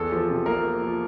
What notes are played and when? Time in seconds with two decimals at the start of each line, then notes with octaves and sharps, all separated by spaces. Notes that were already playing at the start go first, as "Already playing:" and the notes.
Already playing: E2 A4
0.12 F3
0.29 C3
0.46 A#3 A#4
0.64 A#3
0.82 F3